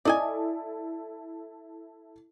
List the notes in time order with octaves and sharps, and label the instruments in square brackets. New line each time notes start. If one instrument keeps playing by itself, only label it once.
[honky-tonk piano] E4 A4 [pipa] D5 D#5 G#5